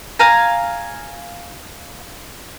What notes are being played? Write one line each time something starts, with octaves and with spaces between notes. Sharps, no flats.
F5 G#5 A#5